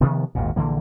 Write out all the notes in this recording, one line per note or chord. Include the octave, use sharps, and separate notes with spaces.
C3 D#3 F3 B3
G#1 D#2 A#2
A#1 D3 E3 A#3